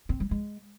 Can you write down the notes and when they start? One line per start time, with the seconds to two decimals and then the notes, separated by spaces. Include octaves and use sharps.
0.09 C4
0.20 G3
0.31 G#3